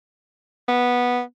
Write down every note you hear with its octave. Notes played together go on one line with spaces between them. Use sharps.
B3